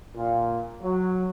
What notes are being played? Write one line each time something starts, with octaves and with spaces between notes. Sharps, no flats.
A#2
F#3